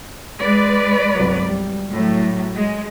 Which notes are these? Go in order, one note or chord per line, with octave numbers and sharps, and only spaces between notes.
G#3 B4 D5
G1 C2 F#3
G3
A2 F#3
G#3